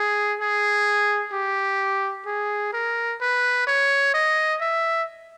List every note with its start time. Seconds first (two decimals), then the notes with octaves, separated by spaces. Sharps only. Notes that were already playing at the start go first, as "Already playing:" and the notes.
Already playing: G#4
0.40 G#4
1.33 G4
2.26 G#4
2.73 A#4
3.21 B4
3.67 C#5
4.14 D#5
4.61 E5